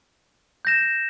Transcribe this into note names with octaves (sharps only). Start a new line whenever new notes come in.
G6 A#6 E7